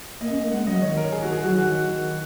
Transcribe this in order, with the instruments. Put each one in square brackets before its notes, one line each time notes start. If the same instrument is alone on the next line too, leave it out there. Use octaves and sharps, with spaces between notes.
[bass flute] A#3 [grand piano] D#5
[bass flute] C#4
A#3
[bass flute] G#3 [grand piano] F#5
[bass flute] F#3 [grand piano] D#5
[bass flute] D#3 [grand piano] C#5
[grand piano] A#4
G#4
F#4
G#4
[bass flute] F#3 [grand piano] F#4
[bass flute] D#3 [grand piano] F#4